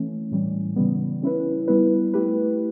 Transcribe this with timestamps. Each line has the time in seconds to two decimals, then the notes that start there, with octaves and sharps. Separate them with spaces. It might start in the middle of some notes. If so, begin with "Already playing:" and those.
Already playing: E3 A3 C#4
0.31 A2 E3 G3 C#4
0.76 C#3 E3 G3 B3
1.22 G3 C#4 E4 B4
1.68 G3 B3 E4 B4
2.14 A3 E4 G4 B4